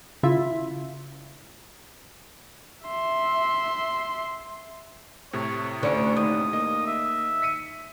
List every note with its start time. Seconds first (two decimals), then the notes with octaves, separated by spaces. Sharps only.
0.23 C#3 E4 F4 E5
2.87 E5 C6
5.33 A2 C3 C#5
5.83 D2 D3 C#4 C#5
6.17 D#2 D#6
6.53 A#3 D#5
6.87 E5
7.42 B6 C#7 D#7